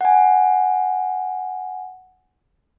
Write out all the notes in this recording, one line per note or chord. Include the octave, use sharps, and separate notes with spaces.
F#5 G#5